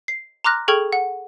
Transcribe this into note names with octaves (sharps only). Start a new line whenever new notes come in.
C7
A#5 C6 D6 F6 F#6 A#6
G#4 A4 G5 C#6 F6 G#6
F#5